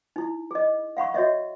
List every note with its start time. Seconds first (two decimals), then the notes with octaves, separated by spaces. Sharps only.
0.16 D#4 E4
0.51 G#4 D#5
0.97 F5 F#5 B5 C#6
1.14 F#4 C#5 D#5 E5